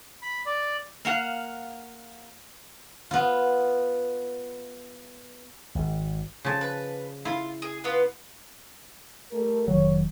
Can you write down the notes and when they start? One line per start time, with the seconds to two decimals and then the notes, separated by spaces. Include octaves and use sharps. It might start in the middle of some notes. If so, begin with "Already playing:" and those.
0.22 B5
0.46 D5
1.05 A#3 F5 F#5
3.11 B3 F4
5.75 G#1
6.45 C#3 F3 A5
6.61 B4
7.25 E4 F4
7.62 G#4
7.84 B3 F4 B4
9.32 G3 A3 A#4
9.68 F1 D#3 F#3 C#5